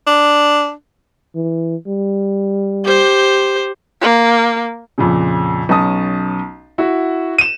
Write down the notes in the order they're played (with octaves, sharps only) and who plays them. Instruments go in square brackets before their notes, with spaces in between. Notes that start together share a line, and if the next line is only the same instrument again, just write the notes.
[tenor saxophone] D4
[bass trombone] E3
G3
[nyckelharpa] G4 C5
[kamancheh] A#3
[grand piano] F2 A#2 C#3
B1 C#4 A5 D#6
E4 F#4
D#7 E7